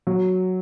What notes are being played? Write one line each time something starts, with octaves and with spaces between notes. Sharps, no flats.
F#3